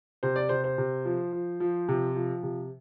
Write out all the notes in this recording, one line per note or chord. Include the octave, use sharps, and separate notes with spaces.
C3 C5
D5
C3 C5
C5
C3
F3
F3
F3
C3
F3
C3